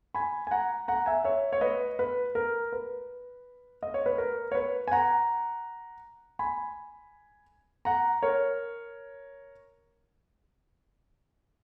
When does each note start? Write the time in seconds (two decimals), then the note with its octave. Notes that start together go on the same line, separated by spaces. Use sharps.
0.14 G#5 B5
0.47 G#5
0.51 F#5 A#5
0.88 F#5 A#5
1.06 E5 G#5
1.24 C#5 E5
1.53 C#5
1.61 B4 D#5
1.99 B4
2.35 A#4
2.72 B4
3.83 D#5
3.94 C#5
4.06 B4
4.18 A#4
4.52 C#5
4.55 B4
4.88 G#5
4.92 F#5 A#5
6.39 G#5 B5
7.85 F#5 A#5
8.23 A#4 C#5